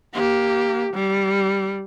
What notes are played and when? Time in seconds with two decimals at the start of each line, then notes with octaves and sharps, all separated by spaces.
0.14 A#3 G4
0.94 G3